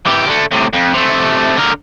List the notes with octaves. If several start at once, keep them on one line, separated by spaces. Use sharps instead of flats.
E3 G4
D3 A3
A2 C3
F2
C3 A3
D3 A#4